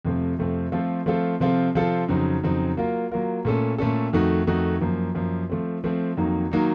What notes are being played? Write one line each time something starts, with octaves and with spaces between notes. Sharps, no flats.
F2 C3 F3 A3 C4
F2 C3 F3 A3 C4
F3 A3 C4 F4 A4
F3 A3 C4 F4 A4
C3 F3 C4 F4 A4
C3 F3 C4 F4 A4
F2 C#3 F#3 C4 D#4
F2 C#3 F#3 C4 D#4
F#3 A#3 F4 A#4
F#3 A#3 F4 A#4
A#2 A3 C#4 A4
A#2 A3 C#4 A4
F2 D#3 A3 D#4 F#4
F2 D#3 A3 D#4 F#4
F#2 F3 A#3
F#2 F3 A#3
F3 A3 C4
F3 A3 C4
F2 D#3 F#3 A#3 D#4
D#3 F#3 A#3 D#4